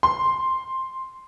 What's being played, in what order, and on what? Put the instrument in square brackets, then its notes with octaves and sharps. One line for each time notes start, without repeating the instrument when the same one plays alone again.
[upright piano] C6